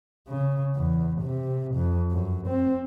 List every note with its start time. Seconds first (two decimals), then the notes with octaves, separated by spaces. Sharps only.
0.29 C#3
0.76 E2
1.21 C3
1.75 F2
2.11 F#2
2.48 C4